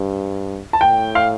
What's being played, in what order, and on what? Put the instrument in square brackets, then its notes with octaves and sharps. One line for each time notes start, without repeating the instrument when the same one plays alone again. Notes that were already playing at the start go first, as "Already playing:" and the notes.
Already playing: [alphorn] G2
[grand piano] A5
[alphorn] A2 [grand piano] G5
[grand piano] F5